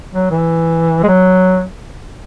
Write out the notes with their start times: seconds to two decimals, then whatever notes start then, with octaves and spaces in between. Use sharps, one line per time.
0.14 F#3
0.31 E3
1.03 G#3
1.08 F#3